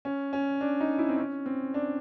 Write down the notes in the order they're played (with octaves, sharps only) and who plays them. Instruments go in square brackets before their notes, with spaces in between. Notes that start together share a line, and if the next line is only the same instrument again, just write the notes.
[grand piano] C#4
C#4
D4
D#4
E4
C4
C#4
C4
D4